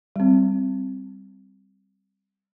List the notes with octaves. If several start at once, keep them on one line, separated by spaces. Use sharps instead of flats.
G3 C4